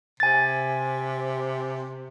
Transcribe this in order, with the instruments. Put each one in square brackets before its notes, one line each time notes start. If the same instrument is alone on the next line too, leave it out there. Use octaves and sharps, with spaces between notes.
[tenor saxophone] C3 [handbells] G#5 A6